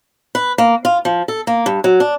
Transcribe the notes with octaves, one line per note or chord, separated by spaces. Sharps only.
B4
A#3
F4
F3
A4
A#3
G2
F#3
D4